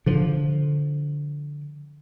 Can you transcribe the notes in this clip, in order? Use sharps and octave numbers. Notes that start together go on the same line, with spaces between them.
D3 F3